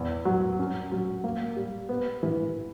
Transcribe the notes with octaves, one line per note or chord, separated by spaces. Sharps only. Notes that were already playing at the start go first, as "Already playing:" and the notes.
Already playing: E2
F#3
C#4
F#3
A#3
G3
B3
E3